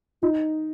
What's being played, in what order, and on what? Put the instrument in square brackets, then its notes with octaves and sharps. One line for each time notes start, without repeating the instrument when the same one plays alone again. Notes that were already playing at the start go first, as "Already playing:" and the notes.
[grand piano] D#4 [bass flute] F4